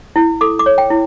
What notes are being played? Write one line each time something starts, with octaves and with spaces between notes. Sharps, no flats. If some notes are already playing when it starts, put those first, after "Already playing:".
E4
A4 D6
D6
C#5
G5
E4